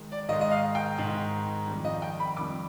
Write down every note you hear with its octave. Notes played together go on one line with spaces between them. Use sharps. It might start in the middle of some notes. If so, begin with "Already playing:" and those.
Already playing: D#3 G#3
D5
G#2 D#3 G#3 D#5
D#5
F5
G5
G#2 D#3 G#3
F2 D#3 G3
D#5
G5
B5
F2 D#3 G3 D6